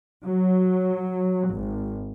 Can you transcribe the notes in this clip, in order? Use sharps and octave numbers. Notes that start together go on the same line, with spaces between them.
F#3
G#1